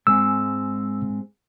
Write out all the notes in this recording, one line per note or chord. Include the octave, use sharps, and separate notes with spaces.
G#2 G#3 C4 E6